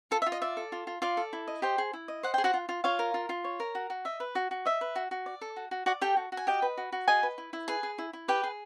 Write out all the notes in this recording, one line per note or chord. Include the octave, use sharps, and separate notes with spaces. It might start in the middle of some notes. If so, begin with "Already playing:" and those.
F4 A4 A5
E5
F4
D#5
D5 E5
A4
F4
F4
F4 D5 F5
A4
E4
D#5
G4 C5 G5
G#4
E4
D#5
C5 F#5
G#4 G5
F#4 F#5
F4
F4
F4 C#5 F5
A#4
F4
F4
C#5
A#4
F#4
F#4
D#5 E5
B4
F#4
F#4
D#5 E5
B4
F#4
F#4
D5
A4
F#4
F#4
F#4 D5 F#5
G4 A4 G5
F#4
F#4
G#5
G4 D#5 G5
B4
F#4
F#4
G#4 D#5 G#5
B4
E4
E4
G#4 B4 G#5
G#4
E4
E4
G4 B4 G5
G#4